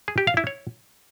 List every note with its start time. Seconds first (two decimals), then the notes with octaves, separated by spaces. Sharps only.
0.08 G#4
0.18 G4
0.27 F5
0.37 E4
0.47 C#5